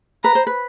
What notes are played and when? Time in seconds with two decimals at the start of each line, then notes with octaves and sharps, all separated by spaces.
0.24 B4 A#5
0.35 C5
0.47 B4